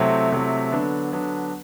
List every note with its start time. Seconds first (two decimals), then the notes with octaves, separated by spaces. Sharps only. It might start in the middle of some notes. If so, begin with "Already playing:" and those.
Already playing: C3 F#3 A3 C4 E4
0.32 C3 F#3 A3 C4 E4
0.72 D3 F#3 B3 D4
1.12 D3 F#3 B3 D4